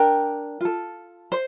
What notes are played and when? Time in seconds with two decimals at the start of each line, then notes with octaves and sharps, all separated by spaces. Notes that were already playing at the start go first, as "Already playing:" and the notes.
Already playing: D4 A#4 G5
0.61 F4 A4
1.32 C5